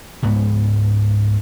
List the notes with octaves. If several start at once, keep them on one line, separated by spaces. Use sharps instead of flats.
C#2 G#2 B3